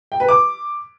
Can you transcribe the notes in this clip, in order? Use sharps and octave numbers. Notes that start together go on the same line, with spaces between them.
G5
B4
D6